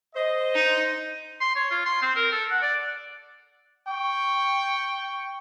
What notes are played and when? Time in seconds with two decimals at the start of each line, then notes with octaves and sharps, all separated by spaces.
0.15 C5 D#5
0.54 D#4
1.40 C6
1.56 C#5
1.70 F4
1.85 C6
2.02 C4
2.16 A#4
2.32 A4
2.50 F#5
2.62 D5
3.88 G5 C#6